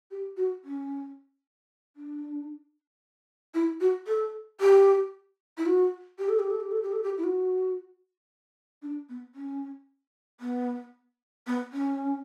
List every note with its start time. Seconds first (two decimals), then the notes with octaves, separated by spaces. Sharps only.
0.11 G4
0.37 F#4
0.64 C#4
1.96 D4
3.54 E4
3.81 F#4
4.07 A4
4.61 G4
5.58 E4
5.66 F#4
6.19 G4
6.29 A4
6.39 G4
6.50 A4
6.60 G4
6.71 A4
6.83 G4
6.93 A4
7.03 G4
7.18 E4
7.24 F#4
8.82 D4
9.09 B3
9.35 C#4
10.40 B3
11.47 B3
11.73 C#4